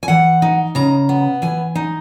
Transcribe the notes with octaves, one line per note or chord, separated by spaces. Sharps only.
G#5
E3 F#5
D#4
C#3 A#5
B3
E3 G#5
D#4